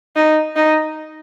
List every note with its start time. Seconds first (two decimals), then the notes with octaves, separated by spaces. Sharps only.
0.16 D#4
0.56 D#4